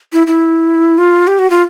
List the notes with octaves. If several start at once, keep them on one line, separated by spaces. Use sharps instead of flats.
E4
E4
F4
G4
F#4
F4